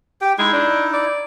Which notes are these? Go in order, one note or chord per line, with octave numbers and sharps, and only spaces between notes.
G4 G5
G#3 D#4 E4
D4
D5